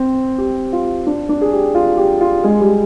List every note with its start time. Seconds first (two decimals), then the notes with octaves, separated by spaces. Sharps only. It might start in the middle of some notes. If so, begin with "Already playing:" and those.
Already playing: C4
0.38 G4
0.73 F4
1.07 D4
1.29 D4
1.41 G#4
1.53 G4
1.75 F4
1.97 G4
2.21 F4
2.44 G#3
2.61 G3